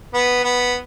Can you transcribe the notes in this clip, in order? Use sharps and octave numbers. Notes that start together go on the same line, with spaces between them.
B3 B4
B3 B4